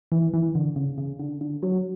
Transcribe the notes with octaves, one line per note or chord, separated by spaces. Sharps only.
E3
E3
D3
C#3
C#3
D3
D3
F#3